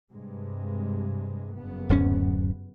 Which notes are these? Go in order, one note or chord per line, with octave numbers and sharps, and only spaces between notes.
G2 C3 G#3
F#1 G2 B3
D1 F#2 C#4